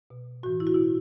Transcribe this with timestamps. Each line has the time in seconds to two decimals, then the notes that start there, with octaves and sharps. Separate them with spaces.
0.10 B2
0.43 A2 E3 F#4
0.60 E4
0.67 F#4
0.74 B2 E4